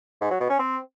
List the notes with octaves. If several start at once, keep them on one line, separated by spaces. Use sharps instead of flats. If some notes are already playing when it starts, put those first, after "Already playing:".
G#2
F#3
B2
C#4
C4